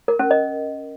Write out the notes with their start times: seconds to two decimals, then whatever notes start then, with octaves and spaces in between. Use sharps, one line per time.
0.08 A#4
0.19 C#4
0.31 D#5